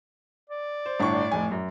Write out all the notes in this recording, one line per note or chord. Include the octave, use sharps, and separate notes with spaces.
D5
C5
G1 A2 D4 C#6
F1 G#5
F#2